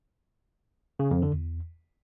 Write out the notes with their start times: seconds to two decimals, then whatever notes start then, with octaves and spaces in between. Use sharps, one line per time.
0.99 C#3
1.11 F2
1.22 D3
1.33 E2